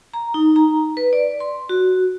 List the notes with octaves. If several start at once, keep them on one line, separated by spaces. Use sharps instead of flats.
A#5
D#4
A#5
B4
D5
C6
F#4